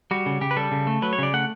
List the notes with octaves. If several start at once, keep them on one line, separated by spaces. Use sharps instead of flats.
G3 F#4
C#3
C#3 G4
B4
G3 A4
C#3
A3
F#3 B4
C#5
C#3 D5
A3 F#5